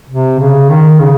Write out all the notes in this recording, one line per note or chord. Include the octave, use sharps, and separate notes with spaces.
C3
C#3
D#3
C#3